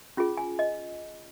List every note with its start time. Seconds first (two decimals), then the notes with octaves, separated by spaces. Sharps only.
0.17 C#4 F4 G#4
0.37 G#5
0.59 D#5